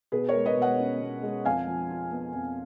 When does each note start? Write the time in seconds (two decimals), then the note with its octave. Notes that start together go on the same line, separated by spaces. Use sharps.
0.12 B2 G#4 B4
0.29 A#4 C#5
0.34 G#3
0.46 B4 D#5
0.57 B2
0.62 D#5 F#5
0.79 C#4
1.01 B2
1.23 G#3
1.45 F2 F5 G#5
1.68 F3
1.90 F4
2.11 B3
2.34 F2